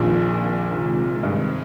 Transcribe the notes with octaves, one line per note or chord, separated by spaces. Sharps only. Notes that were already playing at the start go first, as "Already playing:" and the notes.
Already playing: A#1 F2 A#2 D#3 A#3 D4
C3 D#3 G#3
G2